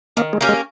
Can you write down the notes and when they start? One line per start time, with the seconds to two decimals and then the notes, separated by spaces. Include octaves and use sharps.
0.17 D#3 A#3
0.33 G#3
0.41 A#3 C#4 G4
0.49 G#3